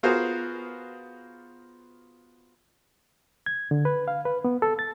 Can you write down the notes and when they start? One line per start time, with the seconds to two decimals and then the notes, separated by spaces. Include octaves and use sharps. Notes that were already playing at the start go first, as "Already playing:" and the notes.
0.03 B3 F4 F#4 G#4 A#4 C5
3.46 G#6
3.71 D3
3.85 B4
4.08 F5
4.25 B4
4.45 B3
4.62 A4
4.79 A6